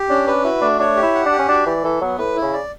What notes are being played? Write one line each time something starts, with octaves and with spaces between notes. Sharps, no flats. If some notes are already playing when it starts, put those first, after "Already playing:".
Already playing: G4
C#4 D4
D4 B4
E4 F#4
A3 D4
D4 C#5
G4
E4
F#5
D4
G4
C#4
D4 F#4
E3 D5
E3 A4
F#3 B3
A2 B4
E4
C#3
D5